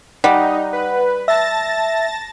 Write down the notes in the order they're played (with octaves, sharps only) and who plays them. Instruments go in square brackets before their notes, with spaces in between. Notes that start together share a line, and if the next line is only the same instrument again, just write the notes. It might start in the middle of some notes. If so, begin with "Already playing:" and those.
[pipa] G3 [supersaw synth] D#4 [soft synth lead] F#5
[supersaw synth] B4
[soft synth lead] E5 [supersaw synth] A5 A6 A#6